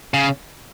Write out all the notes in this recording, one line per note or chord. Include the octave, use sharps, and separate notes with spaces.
C#3